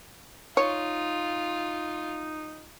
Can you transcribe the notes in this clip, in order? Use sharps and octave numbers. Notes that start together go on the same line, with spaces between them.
D#4 F4 C#5